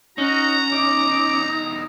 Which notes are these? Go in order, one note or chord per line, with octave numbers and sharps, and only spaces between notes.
C#4 D#4 F#4 A#5
E2 D#4 D6